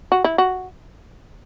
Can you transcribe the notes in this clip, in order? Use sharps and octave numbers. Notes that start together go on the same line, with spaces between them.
F#4
E4
F#4